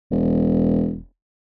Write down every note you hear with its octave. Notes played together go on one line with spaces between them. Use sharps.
E1